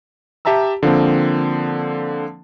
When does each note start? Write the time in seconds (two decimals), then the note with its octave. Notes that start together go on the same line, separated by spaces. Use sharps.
0.45 G4 E5 A5 A#5 E6
0.83 D3 F3 A#3 C4